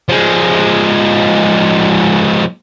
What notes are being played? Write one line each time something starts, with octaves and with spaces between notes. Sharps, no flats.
F3 G#3